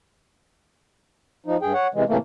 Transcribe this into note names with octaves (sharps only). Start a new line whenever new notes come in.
F3 D#4
G2 G#4 G5
C#5 F#5
C3 E3 G#3
A2 C3 E3 A3 A#3